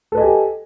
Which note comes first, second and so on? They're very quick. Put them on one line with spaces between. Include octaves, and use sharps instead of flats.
A4 B4 D#5 G#5 G4